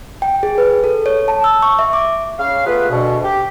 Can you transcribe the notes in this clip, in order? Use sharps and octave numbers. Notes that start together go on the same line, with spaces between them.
G5
G#4
B4
A4
C#5
A5
E6
C#6
E5
D6
C#3 F5
A3 B3 F4 G#4 B4
D2 B2
G4